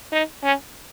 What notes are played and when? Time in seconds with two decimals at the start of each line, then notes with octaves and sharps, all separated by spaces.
0.12 D#4
0.43 C#4